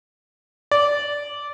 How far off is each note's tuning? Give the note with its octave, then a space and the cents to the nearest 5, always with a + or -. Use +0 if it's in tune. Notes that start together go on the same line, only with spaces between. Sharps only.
D5 -15